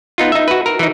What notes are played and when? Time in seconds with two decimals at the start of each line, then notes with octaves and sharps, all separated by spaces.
0.18 B3 D#4 F4
0.32 D#4 E5
0.48 F#4 B4
0.66 A#4
0.79 E3 D#4